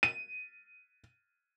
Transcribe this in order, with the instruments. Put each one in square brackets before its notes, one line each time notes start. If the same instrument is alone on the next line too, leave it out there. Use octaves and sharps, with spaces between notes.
[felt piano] D#7